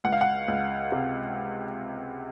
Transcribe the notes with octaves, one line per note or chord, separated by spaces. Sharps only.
C#2 F#5
F5
F#5
C#2
C3